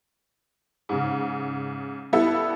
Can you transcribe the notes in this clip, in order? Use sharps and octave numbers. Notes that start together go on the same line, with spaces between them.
G#2 C#3
G3 B3 E4 A4